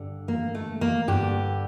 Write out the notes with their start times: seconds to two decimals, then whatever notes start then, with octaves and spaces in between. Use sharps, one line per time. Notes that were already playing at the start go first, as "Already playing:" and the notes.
Already playing: G2 D3
0.28 A#3
0.55 A3
0.81 A#3
1.08 G2 D3 G4